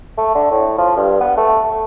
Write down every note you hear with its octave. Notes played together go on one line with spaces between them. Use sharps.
A3
D3
A2
F3
G2
B3
A3
A3